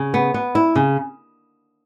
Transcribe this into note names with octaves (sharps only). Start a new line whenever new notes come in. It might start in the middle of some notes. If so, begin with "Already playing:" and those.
Already playing: C#3
B3
B3
E4
C#3